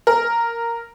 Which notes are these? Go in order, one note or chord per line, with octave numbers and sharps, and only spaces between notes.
A#4